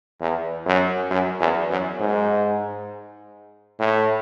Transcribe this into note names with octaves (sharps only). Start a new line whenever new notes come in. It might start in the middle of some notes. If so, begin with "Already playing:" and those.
E2
F#2
F#2
E2
F#2
G#2
A2